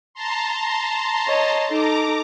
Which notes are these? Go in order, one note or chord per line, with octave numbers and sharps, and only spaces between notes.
A5 A#5 C6
C#5 D#5
D#4 A4 A#5 D6